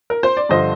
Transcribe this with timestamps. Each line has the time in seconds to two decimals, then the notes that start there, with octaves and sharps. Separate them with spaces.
0.10 A#4
0.23 C5
0.37 D5
0.49 G2 D3 F3 C5 D#5